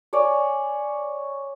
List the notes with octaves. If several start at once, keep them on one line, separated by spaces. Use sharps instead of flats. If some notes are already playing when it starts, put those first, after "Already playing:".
C#5 D5 G#5